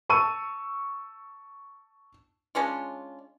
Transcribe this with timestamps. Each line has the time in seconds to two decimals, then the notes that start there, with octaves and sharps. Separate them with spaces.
0.09 A5 C#6 E6 D#7
2.55 G#3 C#4 D4 F4